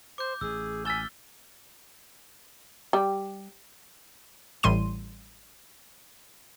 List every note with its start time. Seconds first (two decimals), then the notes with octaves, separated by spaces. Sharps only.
0.18 C5 D6 G6
0.41 A1 G#4 E6
0.85 G#5 E6 F6 A6 B6 G7
2.93 G3
4.63 A1 A2 G3 C6 D#7